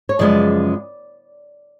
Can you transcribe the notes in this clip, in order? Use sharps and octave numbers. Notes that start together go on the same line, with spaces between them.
C#5
F#2 C#3 F3 G#3 B3 D5